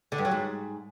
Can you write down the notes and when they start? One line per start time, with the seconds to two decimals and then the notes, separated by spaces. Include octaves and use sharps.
0.12 D3
0.18 G2
0.25 F#3
0.31 G#2